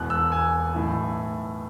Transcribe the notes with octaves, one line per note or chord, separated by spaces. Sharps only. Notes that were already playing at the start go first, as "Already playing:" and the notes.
Already playing: E1 E2 B2 F#6
E6
G#5
B1 A2 E3